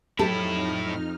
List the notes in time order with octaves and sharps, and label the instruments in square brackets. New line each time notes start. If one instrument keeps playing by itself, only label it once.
[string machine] F2 D#4 F6 [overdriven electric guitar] A2 E4 [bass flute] F#3 [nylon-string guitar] G4 A4